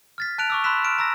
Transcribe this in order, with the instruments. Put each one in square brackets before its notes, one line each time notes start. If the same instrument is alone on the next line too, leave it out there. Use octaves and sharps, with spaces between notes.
[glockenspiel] F6 A6 B6
A5 F#6 D7 F7
C#6 D6 E6
B5 C6 E6 F#6 B6 E7
F6 D7 E7
A#5 E6 A#6